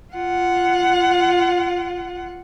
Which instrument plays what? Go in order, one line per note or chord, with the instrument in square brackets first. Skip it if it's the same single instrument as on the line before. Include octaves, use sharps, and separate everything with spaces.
[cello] F4 F#5